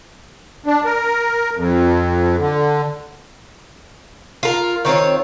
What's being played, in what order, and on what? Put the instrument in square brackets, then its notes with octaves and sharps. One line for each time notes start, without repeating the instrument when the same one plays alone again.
[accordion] D4
A#4
F2
D3
[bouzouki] F4 A#4
D#3 C4 F4 C#5